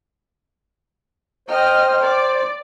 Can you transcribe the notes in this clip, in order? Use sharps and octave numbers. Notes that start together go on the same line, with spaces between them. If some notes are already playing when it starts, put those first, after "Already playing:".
C5 D#5 G5 F6
D5